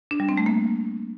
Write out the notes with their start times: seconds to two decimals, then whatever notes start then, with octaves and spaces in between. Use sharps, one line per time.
0.11 D4
0.20 G3
0.29 C4
0.37 A3
0.46 A#3